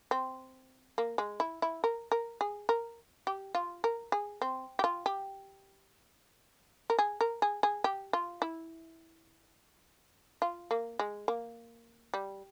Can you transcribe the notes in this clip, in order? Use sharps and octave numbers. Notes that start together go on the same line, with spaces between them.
C4
A#3
G#3
E4
E4
A#4
A#4
G#4
A#4
G4
F4
A#4
G#4
C4
G4
F4
G4
A#4
G#4
A#4
G#4
G#4
G4
F4
E4
F4
A#3
G#3
A#3
G3